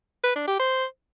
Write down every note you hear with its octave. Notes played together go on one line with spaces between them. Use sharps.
B4
D4
G4
C5